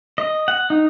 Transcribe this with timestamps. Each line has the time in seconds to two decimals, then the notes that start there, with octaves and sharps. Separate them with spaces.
0.18 D#5
0.48 F#5
0.70 D#4